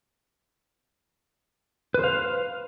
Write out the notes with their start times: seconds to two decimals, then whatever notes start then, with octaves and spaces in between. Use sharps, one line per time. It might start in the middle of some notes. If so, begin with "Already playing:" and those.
1.94 B4
1.99 C5
2.04 F5